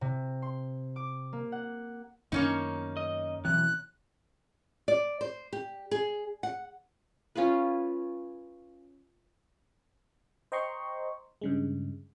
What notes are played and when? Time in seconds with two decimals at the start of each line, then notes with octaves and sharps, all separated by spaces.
0.01 C3
0.42 C6
0.96 D6
1.33 A#3
1.52 F#5
2.32 F#2 D#3 A#3 B3 C#4 D#4
2.97 D#5
3.45 B2 E3 F#3 C4 F#6
4.88 D5
5.21 C5
5.53 G4
5.91 G#4
6.43 F#5
7.35 C#4 F4 G#4 B4
10.52 C5 D#5 G5 A#5 C6 C#6
11.41 G2 C#3 G#3